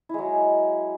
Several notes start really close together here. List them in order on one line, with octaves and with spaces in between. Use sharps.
E4 G#3 F#3